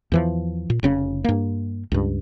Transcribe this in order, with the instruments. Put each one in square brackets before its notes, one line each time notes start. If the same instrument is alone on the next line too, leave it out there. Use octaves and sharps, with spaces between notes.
[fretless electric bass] E2 E3 F3
A#2
F1 C#3 C#4
G2 A#3
C#2 G2